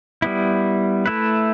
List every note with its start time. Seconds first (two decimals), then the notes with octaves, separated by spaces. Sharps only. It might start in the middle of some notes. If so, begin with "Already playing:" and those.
0.22 G3 B3 E4
1.06 A3 E4 B4